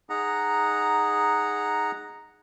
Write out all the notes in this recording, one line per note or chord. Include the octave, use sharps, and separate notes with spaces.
D#4 G#4 F#5 A#5